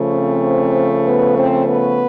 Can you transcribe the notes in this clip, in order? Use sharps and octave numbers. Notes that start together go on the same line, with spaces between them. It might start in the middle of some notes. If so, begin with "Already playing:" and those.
Already playing: C#3 F3 A3
C4 C5
B3 B4
C4 C5
B3 B4